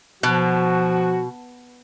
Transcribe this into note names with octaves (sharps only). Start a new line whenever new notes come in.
B2 F3 F#4